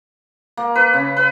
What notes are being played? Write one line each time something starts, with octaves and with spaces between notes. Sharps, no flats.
A#3
B4
C#3
B4